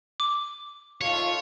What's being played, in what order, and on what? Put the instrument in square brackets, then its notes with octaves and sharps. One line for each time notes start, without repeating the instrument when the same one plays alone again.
[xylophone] D6
[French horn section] D#2 A3 F4 [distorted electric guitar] C#5